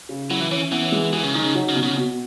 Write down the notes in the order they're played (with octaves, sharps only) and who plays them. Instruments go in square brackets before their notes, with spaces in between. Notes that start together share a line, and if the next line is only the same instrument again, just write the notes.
[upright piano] C#3
[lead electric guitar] F#3 [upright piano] E4
[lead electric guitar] E3
[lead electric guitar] E3 [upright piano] C#4
[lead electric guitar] E3 [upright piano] B3
[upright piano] G#3
[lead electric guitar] E3 [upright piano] G#4
[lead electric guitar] C#3
[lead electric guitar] D#3 [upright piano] D#4
[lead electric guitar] C#3
[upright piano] F#3
[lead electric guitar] C#3
[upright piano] B2
[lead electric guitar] C#3
[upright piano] B2